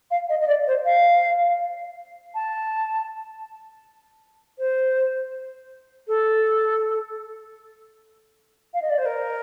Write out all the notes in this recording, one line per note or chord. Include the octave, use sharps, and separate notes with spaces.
F5
D#5
D#5
D5
C5
F5
A5
C5
A4
F5
D#5
D5
C5
A#4